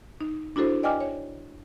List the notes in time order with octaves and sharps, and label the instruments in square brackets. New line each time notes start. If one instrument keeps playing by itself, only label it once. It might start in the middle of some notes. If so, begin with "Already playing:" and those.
[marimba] D#4
D4 E4 F#4 A4 C5
D5 D#5 G5 G#5 D6 F6
C#5